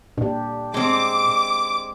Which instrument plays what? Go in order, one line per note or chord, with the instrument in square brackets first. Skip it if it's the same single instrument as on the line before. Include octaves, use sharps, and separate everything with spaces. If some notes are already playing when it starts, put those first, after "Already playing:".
[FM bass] A#2 [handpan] D4 G4
[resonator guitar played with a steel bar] G#3 C4 [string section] D6